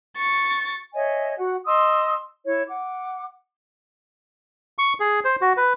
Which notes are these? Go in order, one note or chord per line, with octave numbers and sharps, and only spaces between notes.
C#6 A6
C#5 D#5 E5 G#5
F#4 F#5
D#5 C6 D#6 E6
E4 C#5
F#5 D6
C#6
G#4
C5
F#4
B4